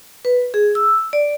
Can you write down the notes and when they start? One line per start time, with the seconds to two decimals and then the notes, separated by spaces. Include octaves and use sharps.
0.25 B4
0.54 G#4
0.75 E6
1.13 D5